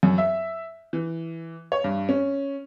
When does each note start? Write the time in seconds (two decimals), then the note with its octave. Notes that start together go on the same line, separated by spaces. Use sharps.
0.03 F#2
0.18 E5
0.93 E3
1.72 C#5
1.84 G2
2.09 C#4